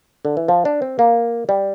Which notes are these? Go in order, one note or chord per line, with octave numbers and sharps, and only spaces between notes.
D3
E3
F3
D4
C4
A#3
G3